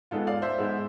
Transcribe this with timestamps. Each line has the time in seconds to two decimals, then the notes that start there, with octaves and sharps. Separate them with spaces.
0.11 G#2 G#3 B3 F4 A4
0.27 D5 F5
0.42 C5 E5
0.58 G#2 G#3 B3